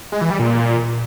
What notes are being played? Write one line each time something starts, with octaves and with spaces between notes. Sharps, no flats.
G#3
E3
G3
A#2